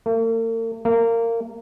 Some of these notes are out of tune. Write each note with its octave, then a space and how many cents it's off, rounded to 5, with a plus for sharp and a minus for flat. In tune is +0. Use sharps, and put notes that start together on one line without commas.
A#3 -45
A#3 -20